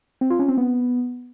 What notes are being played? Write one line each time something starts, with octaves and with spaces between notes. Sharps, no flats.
C4
F4
C#4
C4
B3